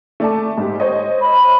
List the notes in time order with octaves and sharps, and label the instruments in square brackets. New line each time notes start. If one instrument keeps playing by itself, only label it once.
[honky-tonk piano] A3 D5 A5
G#2 G4
C5 C#5 D#5
[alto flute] B5